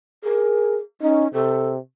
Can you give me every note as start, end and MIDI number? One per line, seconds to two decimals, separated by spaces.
0.24 0.80 68
0.24 0.76 70
1.02 1.28 61
1.02 1.26 63
1.34 1.78 48
1.34 1.70 69